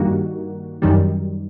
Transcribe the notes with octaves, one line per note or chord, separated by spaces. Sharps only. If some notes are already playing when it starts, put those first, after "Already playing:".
Already playing: G2 D#3 G3 A#3 F#4
F#2 D#3 G3